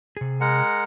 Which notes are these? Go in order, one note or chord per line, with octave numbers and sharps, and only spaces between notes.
C3 G#4
G#3 A#4 F#5